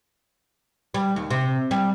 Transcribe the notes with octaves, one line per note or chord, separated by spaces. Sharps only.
G3
D#2
C3
G3